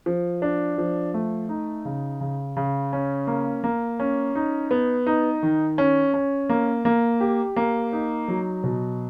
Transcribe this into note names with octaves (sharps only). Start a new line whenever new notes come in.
F3
D4
F3
A3
D#4
C#3
C#3
C#3
C#4
A#3
A#3
C#4
D#4
B3
D#4
D#3
C#4
C#4
A#3
A#3
G4
A#3
D#4
F#3
B2